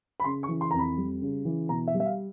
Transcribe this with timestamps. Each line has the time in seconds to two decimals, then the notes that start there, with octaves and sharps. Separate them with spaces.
0.20 B5
0.24 C#3 C6
0.43 C#6
0.48 E3
0.61 C6
0.71 F2 A#5
0.79 B5
0.97 G3
1.22 C#3
1.45 E3
1.69 B2 A#5
1.87 E5
1.94 G3
2.00 E5
2.06 F5